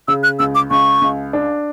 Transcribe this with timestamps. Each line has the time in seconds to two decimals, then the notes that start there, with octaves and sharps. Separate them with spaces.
0.08 C#3 E6
0.23 F#6
0.39 C#2 E6
0.55 D6
0.71 C#2 C#6
1.01 C#2
1.33 D4